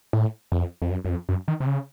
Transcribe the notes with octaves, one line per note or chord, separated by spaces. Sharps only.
A2
F2
F2
F#2
F#2
F2
F#2
D#3
C3
C#3